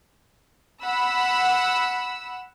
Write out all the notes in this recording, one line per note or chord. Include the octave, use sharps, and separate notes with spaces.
F#5 B5 E6